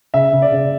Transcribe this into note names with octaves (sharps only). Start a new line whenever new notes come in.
C#3 E5
C#3
D5
C#3